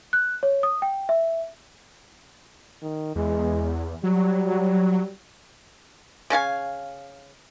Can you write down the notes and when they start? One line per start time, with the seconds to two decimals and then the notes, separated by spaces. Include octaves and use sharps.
0.13 F#6
0.43 C#5
0.63 D#6
0.82 G5
1.09 E5
2.82 D#3
3.15 E2 G#3
4.03 F#3 G3
6.30 C#3 C#4 F5 G#5